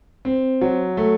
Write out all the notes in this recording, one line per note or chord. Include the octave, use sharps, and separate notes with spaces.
C4
F#3
A3